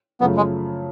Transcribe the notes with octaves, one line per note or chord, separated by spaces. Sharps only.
F#2 C#3 F3 A3 B3
G#3